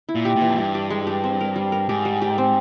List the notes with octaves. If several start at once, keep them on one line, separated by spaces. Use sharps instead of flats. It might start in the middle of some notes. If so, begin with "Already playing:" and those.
E4
A#2
G4
A#2
E3
F2
G2 G4
G4
G#3
G4
C4
A#4
G3
A#4
G#2 G4
G3
G4
C4